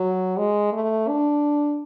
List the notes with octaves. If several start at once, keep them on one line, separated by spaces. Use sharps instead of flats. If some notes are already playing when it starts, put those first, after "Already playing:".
Already playing: F#3
G#3
A3
D4